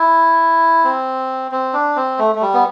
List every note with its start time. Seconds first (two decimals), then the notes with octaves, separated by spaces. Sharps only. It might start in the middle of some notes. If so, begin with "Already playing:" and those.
Already playing: E4
0.84 C4
1.51 C4
1.73 D4
1.96 C4
2.19 A3
2.35 A3
2.41 G3
2.54 B3